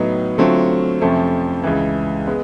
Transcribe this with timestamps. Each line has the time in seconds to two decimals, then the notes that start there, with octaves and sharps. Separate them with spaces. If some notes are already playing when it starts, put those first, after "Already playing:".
Already playing: A2 F#3 B3 D#4
0.38 D3 F#3 A3 C4 F4
1.01 F2 C3 F3 A3 C#4
1.64 C#2 C#3 E3
2.27 G#3 B3